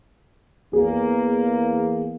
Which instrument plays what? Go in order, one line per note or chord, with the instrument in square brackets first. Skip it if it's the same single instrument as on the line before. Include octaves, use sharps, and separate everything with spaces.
[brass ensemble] E2 A#3 [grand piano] G#4